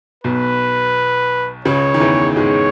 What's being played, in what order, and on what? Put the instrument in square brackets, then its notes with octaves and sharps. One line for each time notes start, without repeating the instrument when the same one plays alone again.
[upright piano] B1 B2 [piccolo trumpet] B4
[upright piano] C#2 C#3 [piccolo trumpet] C#5
[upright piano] D#3
E2 E3
[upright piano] G#2 G#3 [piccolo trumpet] C#5